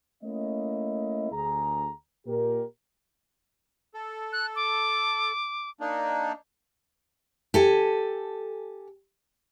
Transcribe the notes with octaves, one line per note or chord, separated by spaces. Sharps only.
A3 A#3 C#4 E4 D#5
D2 G#4 A#5
A#2 G4 A#4
A4
F#6
D6
A#3 D4 D#4
G4 A4 G#5